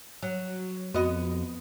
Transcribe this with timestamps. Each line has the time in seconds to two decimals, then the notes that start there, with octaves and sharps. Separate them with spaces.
0.23 F#3
0.94 F2 B3 F#4 D#5